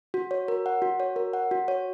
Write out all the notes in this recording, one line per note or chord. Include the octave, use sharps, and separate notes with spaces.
F#4
C#5
A#4
F#5
F#4
C#5
A#4
F#5
F#4
C#5